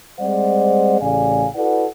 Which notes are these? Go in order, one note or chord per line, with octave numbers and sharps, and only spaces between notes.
G3 G#3 C4 C5 D5 F#5
A1 A2 C#3 D5 F5 G#5
E4 F#4 A4 B4 D5 F#5